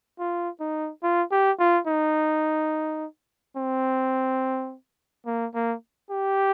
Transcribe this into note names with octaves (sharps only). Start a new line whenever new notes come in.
F4
D#4
F4
G4
F4
D#4
C4
A#3
A#3
G4